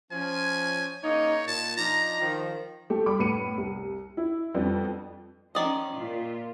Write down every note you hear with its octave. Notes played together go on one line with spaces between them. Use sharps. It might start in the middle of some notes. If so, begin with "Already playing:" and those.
F3 C#4 G#5
C#3 A#3 D#4 C#5
A#2 A5
F3 D4 D#4 A#5
D#3 F3
A3 G4
G3 B5 D6
A2 B3 B5 C#7 D#7
C2
E4
F2 G3 B3 D4
D#3 F3 C#4 D5 D#5
A#2 F4